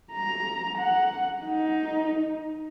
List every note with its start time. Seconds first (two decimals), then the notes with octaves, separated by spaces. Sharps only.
0.13 A#5
0.78 F#5
1.45 D#4